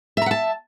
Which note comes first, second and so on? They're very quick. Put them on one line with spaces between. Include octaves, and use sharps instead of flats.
E5 A#5 F#5 A5